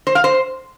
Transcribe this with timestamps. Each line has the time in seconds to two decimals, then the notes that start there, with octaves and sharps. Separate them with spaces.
0.07 C5
0.15 F5
0.24 C5